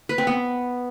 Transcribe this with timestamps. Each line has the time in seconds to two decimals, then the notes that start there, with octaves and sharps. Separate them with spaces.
0.09 B4
0.18 C4
0.27 B3